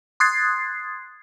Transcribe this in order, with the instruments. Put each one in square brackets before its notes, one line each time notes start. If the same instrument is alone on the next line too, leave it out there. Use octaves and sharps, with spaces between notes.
[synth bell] C6 D#6 F#6 G#6 A6 C7